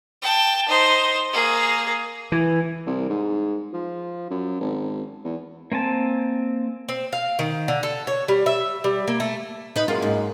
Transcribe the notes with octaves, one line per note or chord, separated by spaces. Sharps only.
G5 A5
D#4 C5
A#3 G#4
E3
C2
G#2
F3
F#2
G#1
E2
A#3 C4 G#5 A5
C4
F5
D#3
D3
A4
C#5
G3
E5
G3
A#3
A3
D#4 B4
F#2 G#3 A#3 F4
G#2